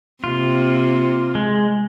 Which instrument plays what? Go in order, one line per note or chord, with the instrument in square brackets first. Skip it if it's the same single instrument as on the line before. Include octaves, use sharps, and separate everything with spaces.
[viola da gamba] C3 A#3 C4 [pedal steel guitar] F4
[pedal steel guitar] G#3